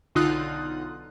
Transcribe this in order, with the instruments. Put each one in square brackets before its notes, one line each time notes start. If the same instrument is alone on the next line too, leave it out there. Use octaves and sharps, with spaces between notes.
[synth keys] B1 D3 D#4 F4 D#6 F#6